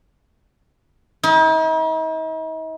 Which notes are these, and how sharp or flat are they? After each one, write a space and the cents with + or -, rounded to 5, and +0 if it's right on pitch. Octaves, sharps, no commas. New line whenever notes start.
D#4 +45